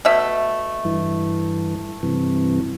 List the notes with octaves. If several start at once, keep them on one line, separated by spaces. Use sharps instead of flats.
B2 A3 E5
G2 E3
G2 C3 E3